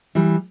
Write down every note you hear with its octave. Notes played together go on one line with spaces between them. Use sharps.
E3 G3